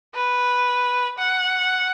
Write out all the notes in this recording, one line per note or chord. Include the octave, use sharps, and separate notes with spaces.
B4
F#5